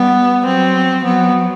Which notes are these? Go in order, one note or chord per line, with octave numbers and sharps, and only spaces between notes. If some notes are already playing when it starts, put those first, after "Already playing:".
Already playing: G3 B3
F#3 C4
F#3 B3